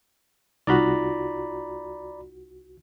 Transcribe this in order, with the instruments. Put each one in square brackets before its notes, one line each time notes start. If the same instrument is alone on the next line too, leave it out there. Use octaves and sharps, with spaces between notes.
[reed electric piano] C2 F#4 [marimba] D#4 F4 [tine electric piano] D5 A#5 B5